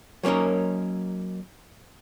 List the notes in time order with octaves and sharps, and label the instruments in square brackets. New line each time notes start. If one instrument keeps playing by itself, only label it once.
[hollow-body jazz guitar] F#3 A#3 C#4 D#4 A#4